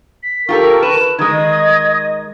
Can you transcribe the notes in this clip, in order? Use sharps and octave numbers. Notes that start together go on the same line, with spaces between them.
B6
F4 G4 A4 A#4 C#6
B4 E7
D#3 G#3 D#5 D#6 G#6